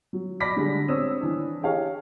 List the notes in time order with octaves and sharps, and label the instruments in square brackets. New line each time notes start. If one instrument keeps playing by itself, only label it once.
[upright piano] F#3
D5 B5 D6 A#6 B6
D3 G3 G#3 D4
C4 C#5 D#6 E6
E3 D4
G4 G#4 C#5 F5